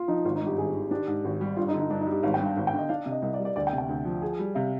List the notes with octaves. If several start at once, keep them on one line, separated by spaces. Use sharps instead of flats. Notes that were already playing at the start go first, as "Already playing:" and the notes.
Already playing: F4
F3 D#4
G#1 F4
D#4
G2
G4
G#1 G#4
D#3
D4 G4
G#2
G#1
G3
G2 F4
D#4
D3
D#4
G2 D4
D#4
G3
G4
G#1 F5
G5
G2
F5
G#1
G5
D3 D#5
D4 F5
C3
D#5
C2 D#5
D5
G3
D5
D2 D5
G5
C3
G5
D2
F3
G#4
G3
C3 F5